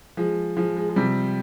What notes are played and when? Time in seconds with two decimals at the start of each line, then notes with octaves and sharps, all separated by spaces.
0.17 F3 G#3
0.57 F3 G#3
0.77 G#3
0.89 G#3
0.96 C3 G3